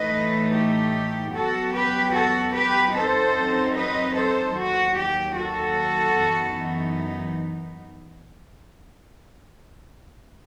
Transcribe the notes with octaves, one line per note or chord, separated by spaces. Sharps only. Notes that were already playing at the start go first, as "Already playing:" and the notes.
Already playing: A2 E3 A3 D#4 B4 D#5
G4
F#2 F#3 B3 F#4 A4
G4 B4
F#4 A4
G4 B4
F#2 F#3 C4 D#4 A4 C5
B4 D#5
A4 C5
D#2 D#3 F#3 F#4
G4
F#4 A4
F#2 E3 B3 D#4